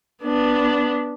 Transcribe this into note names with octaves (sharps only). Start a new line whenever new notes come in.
B3 D4